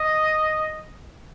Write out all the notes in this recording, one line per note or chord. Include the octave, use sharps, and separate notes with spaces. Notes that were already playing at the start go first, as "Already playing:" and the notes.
Already playing: D#5